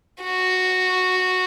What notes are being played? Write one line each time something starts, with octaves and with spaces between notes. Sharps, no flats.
F#4